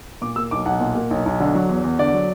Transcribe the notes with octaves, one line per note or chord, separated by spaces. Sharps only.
A#2 D6
A#3 E6
B1 D6
B1 F#5
A#2
A#3
B1
B1
D3
F#3
E2
E2
D3 D5
F#3